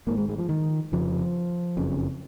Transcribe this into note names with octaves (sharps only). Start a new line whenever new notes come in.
G#1 G#2 A#3
G#3
G#3
F3
D#3
F1 F2 C#3 F3
F#1 F2 C#3